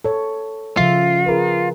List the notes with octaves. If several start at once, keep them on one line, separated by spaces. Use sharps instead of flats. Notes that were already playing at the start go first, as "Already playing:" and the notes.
A4 C#5
C#3 F3 F4 E5
G#4 A#4 B4